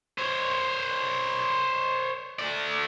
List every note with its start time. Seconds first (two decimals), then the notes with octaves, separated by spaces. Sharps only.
0.18 C5 C#5
2.39 A3 D5